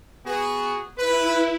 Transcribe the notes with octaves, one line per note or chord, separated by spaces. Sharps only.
B3 F#4 G#4
E4 B4